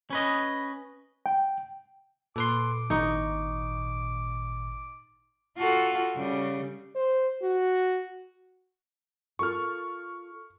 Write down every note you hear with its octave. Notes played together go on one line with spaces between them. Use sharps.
C#4 B4 D#5
G5
A#2 A4 B4 C6 D6
G#1 D#4 C#6
F4 F#4 A4
C#3 G3
C5
F#4
F4 A4 A#4 C#6 F6